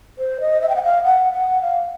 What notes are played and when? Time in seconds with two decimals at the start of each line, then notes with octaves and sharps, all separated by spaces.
0.19 C5
0.41 D#5
0.62 E5
0.69 G5
0.76 F#5
0.84 F5
1.04 F#5
1.33 F#5
1.62 F5